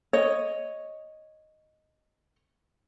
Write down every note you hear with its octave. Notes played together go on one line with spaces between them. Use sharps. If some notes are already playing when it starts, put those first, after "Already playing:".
C#5 D#5